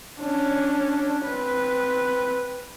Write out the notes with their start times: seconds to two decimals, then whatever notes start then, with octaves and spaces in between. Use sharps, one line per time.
0.20 C#4 D4
1.26 C4 B4